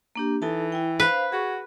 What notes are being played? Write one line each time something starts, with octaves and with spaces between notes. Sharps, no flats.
A#3 D4 G4
E3 D#4 A4 A5
E4 G5
B4 C5 F5
F#4 G#4 C#6